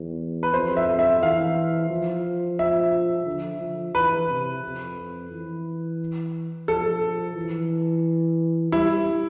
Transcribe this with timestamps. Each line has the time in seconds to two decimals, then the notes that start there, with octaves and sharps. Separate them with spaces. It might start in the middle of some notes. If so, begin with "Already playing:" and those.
Already playing: E2
0.43 B4
0.54 F2 C5
0.77 E5
0.99 E5
1.22 E3 F5
1.90 F3
2.59 E5
3.26 D3
3.61 F3
3.95 E3 B4
4.29 C3
4.63 F2
5.31 E3
6.68 F3 A4
7.36 E3
8.72 G3 E4